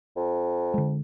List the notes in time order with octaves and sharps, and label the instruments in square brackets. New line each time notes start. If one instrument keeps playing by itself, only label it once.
[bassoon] F2
[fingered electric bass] D3 G#3